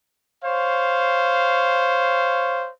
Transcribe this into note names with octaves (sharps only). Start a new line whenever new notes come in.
C5 C#5 F5